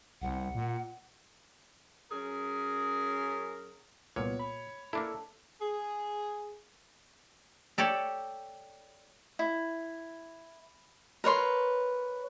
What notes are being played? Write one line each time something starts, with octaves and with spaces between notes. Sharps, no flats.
C2 F#5
A#2
F#2 C#4 G#4 A#4
C2 A#2 B3 C#5
B5
A#3 D4 E4 A4
G#4
G4 A4 C#5 D5
E4
A#4 B4 C#5 C6